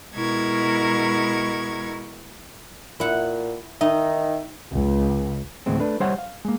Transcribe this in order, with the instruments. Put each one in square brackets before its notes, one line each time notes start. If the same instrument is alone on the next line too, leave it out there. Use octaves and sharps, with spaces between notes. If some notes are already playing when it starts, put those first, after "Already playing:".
[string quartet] B2 G#3 E4 A#4 C#6 G#6
[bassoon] A#2 [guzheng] E4 F#5
[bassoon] D#3 [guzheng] D#4 [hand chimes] E5
[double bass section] C#2
[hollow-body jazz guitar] D2 A2 E3 G#3 C4
A3 D4 B4
G3 G4 C5 C#5 E5 F#5
F5
G#3 A#3